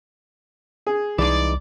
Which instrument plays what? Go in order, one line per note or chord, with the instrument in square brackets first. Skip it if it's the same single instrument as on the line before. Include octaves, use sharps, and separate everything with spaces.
[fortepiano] G#4
[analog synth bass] C2 [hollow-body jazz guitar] E3 G#3 D#4 [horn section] D5